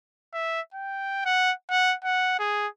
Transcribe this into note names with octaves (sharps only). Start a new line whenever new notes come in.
E5
G5
F#5
F#5
F#5
G#4